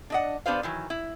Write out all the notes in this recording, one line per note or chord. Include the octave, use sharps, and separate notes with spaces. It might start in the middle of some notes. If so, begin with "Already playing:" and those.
D4 D#5 F#5
B3 D4 G4 B4 C5 F5
D#3 E3 F#3
E4